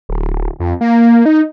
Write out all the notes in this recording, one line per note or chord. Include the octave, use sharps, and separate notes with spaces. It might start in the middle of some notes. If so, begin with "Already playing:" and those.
D1
F2
A#3
D#4